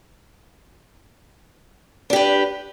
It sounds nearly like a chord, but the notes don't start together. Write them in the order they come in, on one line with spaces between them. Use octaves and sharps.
D4 G4 B4